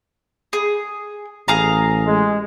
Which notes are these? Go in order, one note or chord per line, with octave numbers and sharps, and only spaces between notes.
G#4
A1 G#4 F5 A#5
G#3